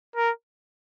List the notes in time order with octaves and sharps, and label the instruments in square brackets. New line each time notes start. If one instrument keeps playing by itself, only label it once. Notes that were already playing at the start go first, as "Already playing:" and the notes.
[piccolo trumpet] A#4